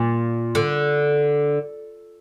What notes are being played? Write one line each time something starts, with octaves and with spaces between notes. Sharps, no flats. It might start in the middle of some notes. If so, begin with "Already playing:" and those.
Already playing: A#2
D3